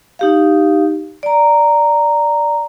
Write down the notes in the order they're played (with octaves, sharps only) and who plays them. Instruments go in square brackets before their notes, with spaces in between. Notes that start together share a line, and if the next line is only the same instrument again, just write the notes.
[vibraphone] D#4 G4 F5
D5 A#5